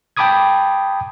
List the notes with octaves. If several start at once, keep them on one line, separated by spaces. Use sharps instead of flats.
G5 A5 B5 D6 D#6 G#6